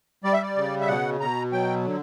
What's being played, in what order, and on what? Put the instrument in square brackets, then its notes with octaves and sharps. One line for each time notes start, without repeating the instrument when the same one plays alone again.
[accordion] G3 D5
E5
D5
C#3
E5
B2 F#5
B2 A#5
F#3 G5
D3